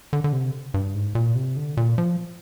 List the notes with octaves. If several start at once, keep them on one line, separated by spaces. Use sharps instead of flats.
D3
D3
C3
G2
G#2
A#2
C3
D3
A#2
F3